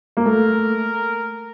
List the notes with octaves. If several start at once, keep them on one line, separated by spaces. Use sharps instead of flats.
A#3
A3 A#4